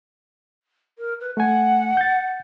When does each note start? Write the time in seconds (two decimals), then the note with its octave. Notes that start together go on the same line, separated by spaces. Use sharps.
0.98 A#4
1.21 B4
1.37 A3 F#5 G#5
1.97 G6 A6